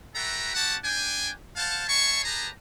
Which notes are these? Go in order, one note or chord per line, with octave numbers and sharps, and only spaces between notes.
F#4 A4 B4 E5 G5 A#5
C#4 F#4 G4 F#5 A5
D4 G5 G#5
C5 F5 F#5 A5
C#5 E5 G#5 A5 C6 C#6
G4 G#4 B4 A5 A#5